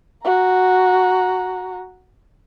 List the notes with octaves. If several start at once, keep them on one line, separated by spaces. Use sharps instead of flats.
F#4 A#5